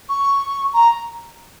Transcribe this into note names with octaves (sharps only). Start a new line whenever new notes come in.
C#6
A#5